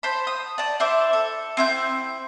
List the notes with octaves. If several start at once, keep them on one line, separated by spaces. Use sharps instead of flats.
C5 A5 B5
D#6
D5 A5
E4 C5 E5 D6
A4
C4 E4 G6